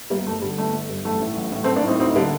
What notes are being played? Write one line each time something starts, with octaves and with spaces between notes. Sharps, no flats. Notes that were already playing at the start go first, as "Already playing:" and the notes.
G1 G3 A#3
G2 A3
D3 G3
G1 A3
G1
G2
A1 A3
A2
A1
A2
A3 C4
A1
A#3 D4
A2 C4 D#4
D2 C4 D#4
D3 G3 A#3